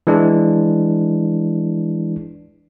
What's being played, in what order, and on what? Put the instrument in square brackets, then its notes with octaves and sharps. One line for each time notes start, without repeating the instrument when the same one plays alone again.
[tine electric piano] E3 G#3 D4